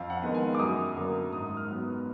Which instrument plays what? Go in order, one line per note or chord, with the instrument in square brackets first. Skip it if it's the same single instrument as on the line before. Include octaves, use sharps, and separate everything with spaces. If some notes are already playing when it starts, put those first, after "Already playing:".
Already playing: [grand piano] F2 F5
F#5
D#3 G#3 B3
G#5
D6
F#2 D#6
D3 F#3 A#3
G#2 D#6
F6
F#3 B3